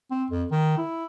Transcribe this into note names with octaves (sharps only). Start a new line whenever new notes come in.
C4
F2
D#3
E4